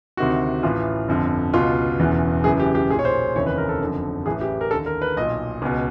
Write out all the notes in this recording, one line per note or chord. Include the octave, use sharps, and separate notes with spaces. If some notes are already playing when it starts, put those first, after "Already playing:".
D2 C3 D#3 F#4
A1 A2 E3 F4
G1 F2 D3
C#2 B2 F4
E1 E2 C#3 E3
F#1 F#2 C#3 E3 G#4
G4
G4
B1 A#2 G#4
C#5
C5
F1 D#2 C#3 E3 C#5
B4
A#4
A4
F#1 F2 D3
A1 A2 E3 G#4
G4
A#4
D#2 D3 A4
A#4
B4
B1 A#2 D#5
C#2 B2